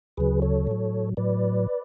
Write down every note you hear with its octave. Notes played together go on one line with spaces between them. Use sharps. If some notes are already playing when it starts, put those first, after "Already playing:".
D2 C#3 F#3 G#4 B4
A4 C#5
A2 F#3
A2 F#3 B4 D5